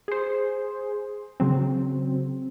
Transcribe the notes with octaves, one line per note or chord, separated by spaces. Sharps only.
G#4 C5
C#3 F#3 C4